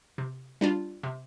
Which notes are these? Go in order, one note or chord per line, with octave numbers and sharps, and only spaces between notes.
C3
G3 D4 F4
C3